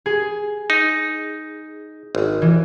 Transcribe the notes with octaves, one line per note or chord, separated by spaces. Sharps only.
G#4
D#4
G#1
E3